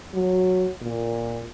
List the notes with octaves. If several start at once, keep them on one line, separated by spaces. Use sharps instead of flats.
F#3
A#2